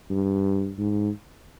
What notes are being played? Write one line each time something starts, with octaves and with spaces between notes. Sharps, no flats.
G2
G#2